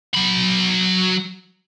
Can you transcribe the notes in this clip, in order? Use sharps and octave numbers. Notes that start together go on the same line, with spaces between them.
F#3 B5